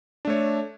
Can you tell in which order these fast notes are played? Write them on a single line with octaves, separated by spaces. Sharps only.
D4 A3 C#5